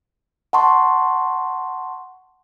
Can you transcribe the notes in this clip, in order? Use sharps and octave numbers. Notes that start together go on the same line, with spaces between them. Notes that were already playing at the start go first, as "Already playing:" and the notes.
F#5 A5 C6 C#6